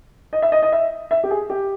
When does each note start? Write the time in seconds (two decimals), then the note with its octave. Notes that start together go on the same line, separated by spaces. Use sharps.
0.33 D#5
0.42 E5
0.52 D#5
0.62 D#5
0.72 E5
1.11 E5
1.24 G4
1.31 G#4
1.50 G4